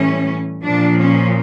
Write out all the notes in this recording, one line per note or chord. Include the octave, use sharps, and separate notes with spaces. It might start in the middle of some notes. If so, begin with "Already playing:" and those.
Already playing: A2 E3 G3 C#4
A#2 F3 D4
C#4